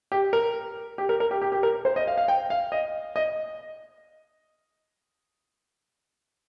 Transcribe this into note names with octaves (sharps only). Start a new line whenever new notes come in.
G4
A#4
G4
A#4
A#4
G4
G4
G4
A#4
C5
D#5
F5
F5
G5
F5
D#5
D#5